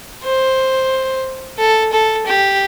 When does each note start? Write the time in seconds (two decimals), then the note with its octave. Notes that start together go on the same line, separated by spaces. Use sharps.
0.23 C5
1.59 A4
1.92 A4
2.26 G4